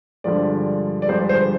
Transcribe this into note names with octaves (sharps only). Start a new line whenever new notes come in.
G2 D3 F3 G#3 D5
D5
G2 D3 F3 G#3 C5
C5